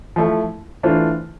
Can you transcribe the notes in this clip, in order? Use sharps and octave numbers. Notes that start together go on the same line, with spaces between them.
F3 A3 E4
E3 A3 D4 F4 C5